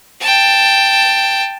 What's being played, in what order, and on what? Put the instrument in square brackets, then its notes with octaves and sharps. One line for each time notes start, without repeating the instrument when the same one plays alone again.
[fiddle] G5 A5